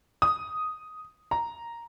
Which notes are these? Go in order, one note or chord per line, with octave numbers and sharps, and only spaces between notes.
D#6
A#5